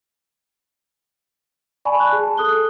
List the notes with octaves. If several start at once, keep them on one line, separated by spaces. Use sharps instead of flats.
D5 G#5 A5 B5 C#6
F#6
G#4 A5
A4 D#6 F#6 G7